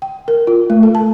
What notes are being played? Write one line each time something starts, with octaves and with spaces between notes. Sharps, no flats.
G5
A#4
F4
A3
A4
A5